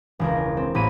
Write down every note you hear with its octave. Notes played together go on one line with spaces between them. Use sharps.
E1 C#2 A#4
C4
A1 A#3 B5 D#7